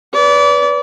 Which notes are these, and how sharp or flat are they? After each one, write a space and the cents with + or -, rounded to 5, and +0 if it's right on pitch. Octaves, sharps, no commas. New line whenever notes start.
B4 +0 D5 -30